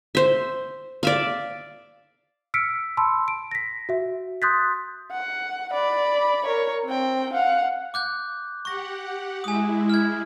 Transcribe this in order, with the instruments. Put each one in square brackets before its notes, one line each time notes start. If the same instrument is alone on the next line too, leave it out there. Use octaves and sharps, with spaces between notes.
[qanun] C5 E5
D5 E5 F5
[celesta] E6 F6 B6 C#7 D7
A5 B5 C6 E6
D7
A#6 B6
F#4 E5
C6 D#6 F#6 G6 A6 B6
[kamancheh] F#5
D5 B5
A#4 C#5
C4 G5
F5 F#5
[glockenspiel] D6 F#6 G6
[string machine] G4 F#5 [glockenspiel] C#6 A#6
[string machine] G#3 E4 [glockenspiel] G#5 D#6
[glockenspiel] F6 G#6